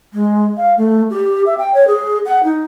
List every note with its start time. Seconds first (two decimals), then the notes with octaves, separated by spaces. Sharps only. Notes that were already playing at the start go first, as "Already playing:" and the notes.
0.13 G#3
0.57 F5
0.78 A3
1.10 G4
1.46 E5
1.58 G5
1.74 C#5
1.88 G#4
2.26 F#5
2.44 D#4